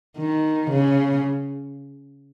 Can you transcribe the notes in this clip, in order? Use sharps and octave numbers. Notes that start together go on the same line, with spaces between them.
D#3
C#3